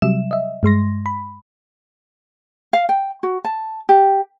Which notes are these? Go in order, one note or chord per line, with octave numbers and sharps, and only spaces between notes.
C3 F#3 G3 E5 E7
D#5 E5
G2 G#3 C6 A#6
B5
F5
G5
F#4
A5
G4